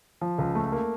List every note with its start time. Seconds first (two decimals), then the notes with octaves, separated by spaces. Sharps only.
0.21 F3
0.38 C#2
0.55 A3
0.72 A#3